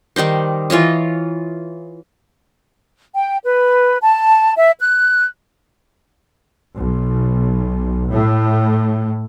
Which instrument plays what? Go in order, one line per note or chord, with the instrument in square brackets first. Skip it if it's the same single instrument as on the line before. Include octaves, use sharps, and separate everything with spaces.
[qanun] D#3 G3 D#4 C5
E3 F4 C#5 D#5
[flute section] G5
B4
A5
E5
F#6
[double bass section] B1
A2